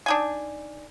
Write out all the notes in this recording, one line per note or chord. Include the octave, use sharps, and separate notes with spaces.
D4 D#4 G#5